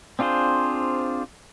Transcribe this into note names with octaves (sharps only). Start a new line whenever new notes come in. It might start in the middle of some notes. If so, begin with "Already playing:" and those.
C4 D4 F4 G#4 C5